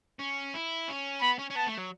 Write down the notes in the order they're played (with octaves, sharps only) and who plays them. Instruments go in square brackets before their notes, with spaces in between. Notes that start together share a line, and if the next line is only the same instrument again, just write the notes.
[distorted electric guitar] C#4
E4
C#4
[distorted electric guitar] B3 [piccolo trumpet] B5
[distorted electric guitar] C#4
C#4
[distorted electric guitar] B3 [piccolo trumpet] A5
[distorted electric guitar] A3
F#3